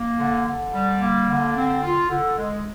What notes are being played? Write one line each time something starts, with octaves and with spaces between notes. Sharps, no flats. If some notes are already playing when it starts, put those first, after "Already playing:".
Already playing: A#3
D3
D3
G3
A#3
D3
C4
F4
D3
G#3